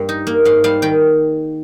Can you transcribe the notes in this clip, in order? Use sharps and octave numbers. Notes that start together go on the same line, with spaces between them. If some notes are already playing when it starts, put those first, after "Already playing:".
Already playing: G2 G3 A#3
D#4
A#3
G#2 F5
G3 F5
D#3 G5